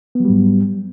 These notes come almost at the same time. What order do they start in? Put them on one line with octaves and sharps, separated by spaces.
B3 F#3 G3 G#2